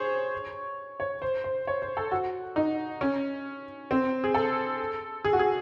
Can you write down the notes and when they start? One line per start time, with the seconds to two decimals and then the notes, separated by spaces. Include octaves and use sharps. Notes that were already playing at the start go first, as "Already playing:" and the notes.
Already playing: G#4 C5 C#5
1.00 C#5
1.22 C5
1.44 C5
1.67 C#5
1.82 C5
1.97 A4
2.11 F#4
2.56 D#4
3.01 C#4
3.91 C4
4.24 G#4
4.34 A4
5.25 G#4
5.33 F#4
5.39 G#4